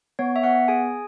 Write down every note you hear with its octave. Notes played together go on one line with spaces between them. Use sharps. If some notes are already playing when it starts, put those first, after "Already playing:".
B3 C#5
E5
B3 F#5
G#4 G#5